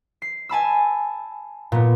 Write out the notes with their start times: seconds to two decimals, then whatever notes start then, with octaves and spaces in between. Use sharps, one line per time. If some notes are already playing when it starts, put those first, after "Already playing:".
0.22 C7
0.49 G#5 A5 B5 E6
1.72 A#2 B3